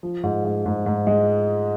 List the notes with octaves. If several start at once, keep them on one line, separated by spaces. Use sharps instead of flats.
F3
G#2
G#2
G#2
G#2
G#3